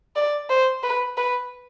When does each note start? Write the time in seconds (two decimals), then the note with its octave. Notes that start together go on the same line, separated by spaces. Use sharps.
0.16 D5
0.50 C5
0.83 B4
1.17 B4